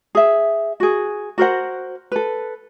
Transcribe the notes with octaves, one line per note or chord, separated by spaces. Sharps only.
G#4 E5
F#4 G#4
F#4 A#4 C5 F#5
A4 B4